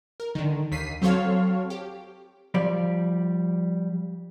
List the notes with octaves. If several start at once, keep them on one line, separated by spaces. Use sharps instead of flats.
A#4
D3 D#3
D#2 B6 C7 D#7
F#3 C4 A4 C#5 F5
G4
F3 G3 D5